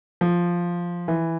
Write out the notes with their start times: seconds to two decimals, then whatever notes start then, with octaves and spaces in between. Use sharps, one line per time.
0.21 F3
1.08 E3